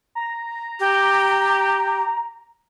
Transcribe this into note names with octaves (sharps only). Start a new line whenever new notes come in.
A#5
G4